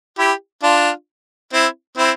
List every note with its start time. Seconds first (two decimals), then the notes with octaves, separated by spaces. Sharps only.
0.19 E4 G4
0.63 D4 F4
1.53 C4 E4
1.98 C4 E4